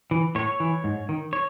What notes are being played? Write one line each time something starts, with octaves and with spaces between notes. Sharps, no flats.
E3
A2 C#5
E3
G#2
D#3
C#5